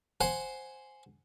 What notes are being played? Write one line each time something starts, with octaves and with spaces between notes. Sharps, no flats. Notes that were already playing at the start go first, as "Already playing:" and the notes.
C5 F#5 G#5